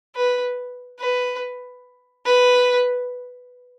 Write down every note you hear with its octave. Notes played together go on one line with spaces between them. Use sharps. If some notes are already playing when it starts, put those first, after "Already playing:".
B4
B4
B4